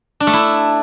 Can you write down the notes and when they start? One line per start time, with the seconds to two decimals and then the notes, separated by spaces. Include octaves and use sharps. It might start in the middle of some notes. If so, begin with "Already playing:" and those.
0.20 D4
0.27 A3
0.33 E4